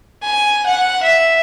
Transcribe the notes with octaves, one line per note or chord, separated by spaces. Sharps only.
G#5
F#5
E5